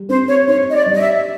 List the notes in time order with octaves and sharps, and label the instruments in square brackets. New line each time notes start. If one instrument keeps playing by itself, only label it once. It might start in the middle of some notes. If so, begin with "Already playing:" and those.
Already playing: [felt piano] G3
[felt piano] C4 [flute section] C5
[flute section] C#5
[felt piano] D#4 [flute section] C#5
[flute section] D#5
D5
[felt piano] G3
[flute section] D#5
E5